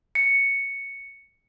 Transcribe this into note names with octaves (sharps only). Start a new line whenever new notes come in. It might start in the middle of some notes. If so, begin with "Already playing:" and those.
C#7